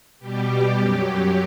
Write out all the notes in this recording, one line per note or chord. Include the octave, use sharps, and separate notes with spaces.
B2 G3 G4
F#2 F#3 G4